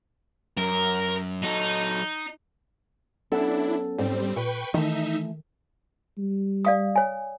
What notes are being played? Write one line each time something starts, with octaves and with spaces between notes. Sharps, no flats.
F#2 A#4
F#3 D#4 A4
F#3 B3 C#4 D4 E4 A4
G#2 G3 C4
A#2 B4 G5 C#6
D#3 E3 A3 D#4 E5
G3
D5 F5 D#6
C#5 G#5